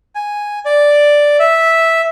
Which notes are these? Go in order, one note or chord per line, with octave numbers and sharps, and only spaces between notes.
G#5
D5
E5